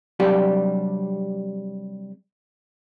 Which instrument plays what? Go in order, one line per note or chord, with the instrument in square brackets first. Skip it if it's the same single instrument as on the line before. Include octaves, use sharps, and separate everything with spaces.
[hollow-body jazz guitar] C3 F#3 G3 D4 G4